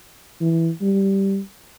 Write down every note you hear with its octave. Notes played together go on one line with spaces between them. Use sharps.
E3
G3